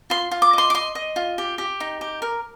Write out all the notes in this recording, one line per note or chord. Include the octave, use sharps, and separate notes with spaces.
F4 C6
F4
D6
D#5 C6
D6
D#5 C6
D#5
F4
G4
G4
D#4
G4
A#4